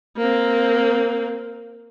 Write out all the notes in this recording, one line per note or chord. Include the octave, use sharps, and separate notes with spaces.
A#3 C4